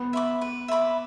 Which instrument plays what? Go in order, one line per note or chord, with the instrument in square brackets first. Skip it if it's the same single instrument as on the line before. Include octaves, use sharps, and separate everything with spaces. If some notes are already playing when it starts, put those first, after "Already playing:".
Already playing: [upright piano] B3
[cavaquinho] E5 B5 D6
B4
E5 B5 D6